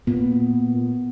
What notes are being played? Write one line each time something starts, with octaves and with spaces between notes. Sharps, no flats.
A#2 B3